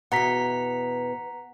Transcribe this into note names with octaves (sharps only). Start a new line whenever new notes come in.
E2 B2 F#5 A#5 B6